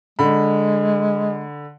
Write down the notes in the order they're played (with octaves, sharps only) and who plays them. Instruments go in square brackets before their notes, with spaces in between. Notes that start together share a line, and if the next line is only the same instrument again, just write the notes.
[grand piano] D3 B5 [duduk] G#3